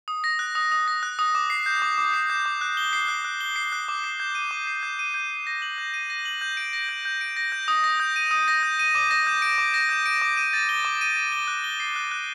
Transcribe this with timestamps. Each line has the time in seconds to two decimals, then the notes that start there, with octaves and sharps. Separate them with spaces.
0.08 D#6
0.24 A#6
0.39 F#6
0.55 D#6
0.72 D#6
0.88 A#6
1.03 F#6
1.19 D#6
1.35 D6
1.50 C7
1.66 G6
1.82 D6
1.98 D6
2.14 C7
2.30 G6
2.46 D6
2.61 F#6
2.77 G7
2.93 C7
3.08 F#6
3.25 F#6
3.41 G7
3.56 C7
3.72 F#6
3.88 D6
4.04 C7
4.20 G6
4.35 D#7
4.51 D6
4.67 C7
4.83 G6
4.99 D#7
5.14 G6
5.30 D#7
5.47 A#6
5.62 F#7
5.78 G6
5.94 D#7
6.10 A#6
6.25 F#7
6.41 G6
6.57 D7
6.73 A#6
6.89 G6
7.05 G6
7.21 D7
7.36 A#6
7.52 G6
7.68 D#6
7.84 A#6
8.00 G6
8.16 D#7
8.31 D#6
8.48 A#6
8.63 G6
8.79 D#7
8.95 D6
9.11 A#6
9.27 G6
9.42 D7
9.58 D6
9.74 A#6
9.89 G6
10.06 D7
10.22 D6
10.37 D#7
10.53 A6
10.69 G7
10.85 D6
11.01 D#7
11.16 A6
11.32 G7
11.48 F#6
11.64 G7
11.80 C7
11.96 F#6
12.11 F#6